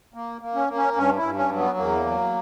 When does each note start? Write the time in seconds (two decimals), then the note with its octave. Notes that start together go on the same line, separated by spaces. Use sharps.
0.14 A#3
0.41 A#3
0.55 C#4
0.68 A#3
0.75 C#4
0.96 G2 C#4
1.16 E4
1.22 G2
1.36 C#4
1.50 F#3
1.57 B3
1.77 E2 A#3
2.05 F#3